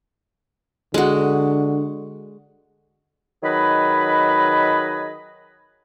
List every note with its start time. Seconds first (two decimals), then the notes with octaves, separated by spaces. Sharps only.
0.94 D3 G#3 F#4
3.43 D#3 F#3 G#4 B4 D#5 B5